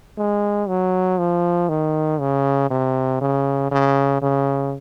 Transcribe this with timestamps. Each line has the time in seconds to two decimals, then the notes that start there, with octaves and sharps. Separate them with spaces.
0.18 G#3
0.68 F#3
1.18 F3
1.69 D#3
2.20 C#3
2.71 C3
3.21 C#3
3.71 C#3
4.22 C#3